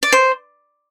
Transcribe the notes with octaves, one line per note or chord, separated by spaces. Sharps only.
D5
C5